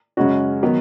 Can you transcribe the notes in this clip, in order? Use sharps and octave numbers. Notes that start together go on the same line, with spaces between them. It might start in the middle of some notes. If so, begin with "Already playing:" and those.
F#2 C#3 G#3 C#4 F#4
D#3 F#3 B3